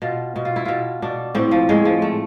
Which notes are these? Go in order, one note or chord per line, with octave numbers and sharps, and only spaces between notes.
B2 F4
B2
F4
E4
B2 F4
B2 D4
A2 C4
F3
A2 G#3
F3
A3